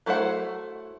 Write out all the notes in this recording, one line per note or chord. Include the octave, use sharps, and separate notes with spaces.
F#3 A3 E4 C5 F#5